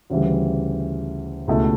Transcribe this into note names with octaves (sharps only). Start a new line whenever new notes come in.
D2 C#3 E3 G3
C#2 B2 A3 E4